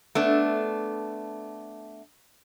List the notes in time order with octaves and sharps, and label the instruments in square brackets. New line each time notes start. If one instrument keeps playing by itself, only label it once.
[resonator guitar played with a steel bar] A3 B3 D4